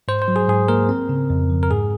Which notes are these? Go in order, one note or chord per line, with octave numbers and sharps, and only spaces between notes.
G#2 C5
C5
F#3
G#4
G#2 G#4
A#3 A#4
C4
C#3
F2
F3
A#4
G#2 G#4